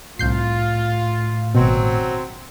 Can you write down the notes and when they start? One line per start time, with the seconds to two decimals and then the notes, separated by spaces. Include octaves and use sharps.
0.19 C2 A2 F4 G6 C7
1.55 G#1 B2 F#3 C4